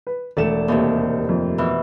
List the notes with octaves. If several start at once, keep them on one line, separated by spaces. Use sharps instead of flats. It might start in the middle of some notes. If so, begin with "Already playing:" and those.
B4
E1 A3 D5 E7
D#2 A2 C3
F2
B2 E3